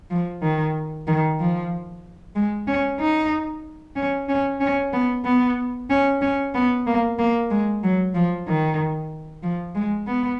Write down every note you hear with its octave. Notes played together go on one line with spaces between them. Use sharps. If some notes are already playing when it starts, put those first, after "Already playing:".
F3
D#3
D#3
F3
G#3
C#4
D#4
C#4
C#4
C#4
B3
B3
C#4
C#4
B3
A#3
A#3
G#3
F#3
F3
D#3
F3
G#3
B3